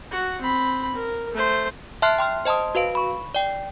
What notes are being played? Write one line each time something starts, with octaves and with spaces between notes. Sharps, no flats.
F#4
C4 B5
A#4
A3 C5
E5 A5 C6 F6 F#6 C7
G5 C6 F6
C5 D#5 A5 C6 D#6
F#4 B4 F5 D7
B5 C#6
D5 G5